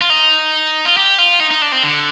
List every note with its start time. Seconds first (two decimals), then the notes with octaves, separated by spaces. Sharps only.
0.01 F4
0.10 D#4
0.85 F4
0.97 G4
1.18 F4
1.40 D#4
1.51 D#4
1.62 D4
1.72 C4
1.83 D3